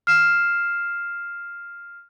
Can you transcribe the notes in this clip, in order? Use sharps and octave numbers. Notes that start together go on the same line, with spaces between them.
F6 C7 E7